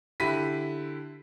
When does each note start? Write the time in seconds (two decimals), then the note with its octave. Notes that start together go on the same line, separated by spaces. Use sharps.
0.20 D3 E4 G4 B5 B6 D#7